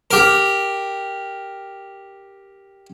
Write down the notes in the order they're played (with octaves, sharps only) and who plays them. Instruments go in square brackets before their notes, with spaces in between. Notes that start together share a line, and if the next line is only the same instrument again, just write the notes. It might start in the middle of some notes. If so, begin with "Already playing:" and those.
[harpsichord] G4 A#4